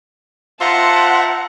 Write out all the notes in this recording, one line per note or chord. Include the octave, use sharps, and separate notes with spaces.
F4 C5 E5 F#5 A5 A#5